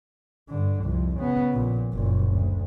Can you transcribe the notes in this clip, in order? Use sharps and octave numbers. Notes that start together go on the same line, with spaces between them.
G2 D3
C2 F2
C#3 B3
A#1 A#2
F#1 A#2
D2